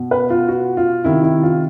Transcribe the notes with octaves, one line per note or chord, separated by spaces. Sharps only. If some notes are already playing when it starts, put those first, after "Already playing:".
Already playing: B2
B4
F4
F#4
F4
C3 D#3 E4
E4
F4